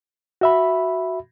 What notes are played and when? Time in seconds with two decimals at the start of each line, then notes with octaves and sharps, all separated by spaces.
0.41 F#4 E5 B5